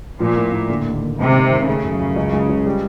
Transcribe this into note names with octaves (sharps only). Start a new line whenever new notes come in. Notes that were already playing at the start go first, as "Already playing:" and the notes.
A#2 F3
A2
A2
D3
D#2
D#2
G#2 C3
D#3
D#3
C#3 A3
F#2
F#2
C#2
G#3
C#2
G3